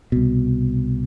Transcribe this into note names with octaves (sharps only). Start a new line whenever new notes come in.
C2 B2